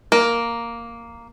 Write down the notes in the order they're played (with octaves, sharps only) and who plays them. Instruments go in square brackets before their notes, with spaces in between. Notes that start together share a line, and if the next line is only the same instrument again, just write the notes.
[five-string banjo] A#3